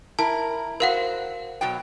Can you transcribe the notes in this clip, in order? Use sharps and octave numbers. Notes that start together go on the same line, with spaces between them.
E4 A#4 A5
F#4 A#4 C5 F5 F#5
B2 F#3 G5